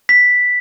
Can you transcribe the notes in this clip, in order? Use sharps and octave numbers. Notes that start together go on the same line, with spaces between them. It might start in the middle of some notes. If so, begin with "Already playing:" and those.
B6